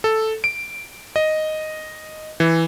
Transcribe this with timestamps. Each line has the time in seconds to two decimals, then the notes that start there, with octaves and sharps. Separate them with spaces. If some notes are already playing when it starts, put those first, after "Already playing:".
0.04 A4
0.44 D7
1.16 D#5
2.40 E3